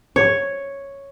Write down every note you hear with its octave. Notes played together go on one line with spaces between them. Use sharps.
C#5